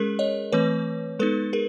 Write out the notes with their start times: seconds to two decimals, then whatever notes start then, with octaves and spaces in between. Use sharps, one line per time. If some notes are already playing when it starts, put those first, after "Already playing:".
Already playing: G#3 C#4 G#4 A#4
0.19 C#5 D#5
0.52 E3 A3 C4 B4 C#5
1.19 G#3 B3 D#4 A4 B4
1.53 G#4 A#4